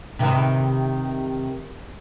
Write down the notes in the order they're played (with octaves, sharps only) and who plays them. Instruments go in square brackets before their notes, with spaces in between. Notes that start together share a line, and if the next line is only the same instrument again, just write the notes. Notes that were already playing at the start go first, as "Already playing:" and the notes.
[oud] C3 D#3 B4